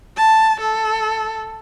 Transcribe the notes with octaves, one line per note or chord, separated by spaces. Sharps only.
A5
A4